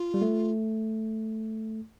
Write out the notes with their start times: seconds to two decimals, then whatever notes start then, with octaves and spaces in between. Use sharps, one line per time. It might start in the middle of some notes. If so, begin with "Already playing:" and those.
Already playing: F4
0.14 G3
0.22 A3